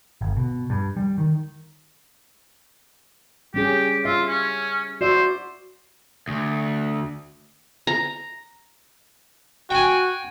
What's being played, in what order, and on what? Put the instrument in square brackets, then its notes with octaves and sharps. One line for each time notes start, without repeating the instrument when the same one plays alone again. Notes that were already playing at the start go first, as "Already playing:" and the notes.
[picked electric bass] G1
B2
G2
G3
D#3
[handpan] G3 C#4 G#4 [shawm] G4
[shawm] F4 [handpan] E5
[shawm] C#4
[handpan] F#4 D5 E5 [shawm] C5
[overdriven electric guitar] D2
[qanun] A#5
[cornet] F#4 [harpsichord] G5 G#5